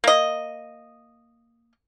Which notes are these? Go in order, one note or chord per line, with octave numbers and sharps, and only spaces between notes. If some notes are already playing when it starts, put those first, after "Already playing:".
A#3 D#5